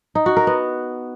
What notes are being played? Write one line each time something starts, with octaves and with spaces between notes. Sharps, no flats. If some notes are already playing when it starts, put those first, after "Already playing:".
D#4
F#4
A#4
B3